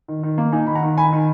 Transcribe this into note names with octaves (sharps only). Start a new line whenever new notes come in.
D#3
D#3
A#3
D#4 G#5
D#3 B5
F#5 A#5
D#3
D#3 G#5 B5
D#3